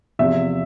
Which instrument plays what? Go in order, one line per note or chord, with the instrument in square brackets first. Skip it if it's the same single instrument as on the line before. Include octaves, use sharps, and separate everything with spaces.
[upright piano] E2 C3 F3 E5